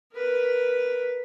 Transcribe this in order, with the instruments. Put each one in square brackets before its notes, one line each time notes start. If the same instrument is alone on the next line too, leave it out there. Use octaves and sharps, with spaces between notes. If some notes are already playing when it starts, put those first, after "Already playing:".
[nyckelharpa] A#4 B4